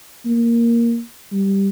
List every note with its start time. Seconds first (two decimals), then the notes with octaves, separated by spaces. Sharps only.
0.26 A#3
1.32 G3